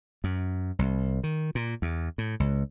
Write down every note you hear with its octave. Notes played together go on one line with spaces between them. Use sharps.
F#2
C2
D#3
A#2
E2
A2
C#2